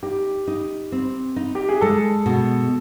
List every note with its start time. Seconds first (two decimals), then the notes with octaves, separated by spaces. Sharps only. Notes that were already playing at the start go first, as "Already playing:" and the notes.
0.03 D#4 G4
0.47 D#4
0.92 C4
1.36 D#4
1.55 G4
1.69 G#4
1.81 G#3 A4
2.26 B2